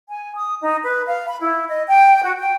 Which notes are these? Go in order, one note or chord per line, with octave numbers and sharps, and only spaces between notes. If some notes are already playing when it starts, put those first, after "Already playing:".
G#5
D#6
D#4
B4
F5
B5
E4
D#5
G5
F#4
G5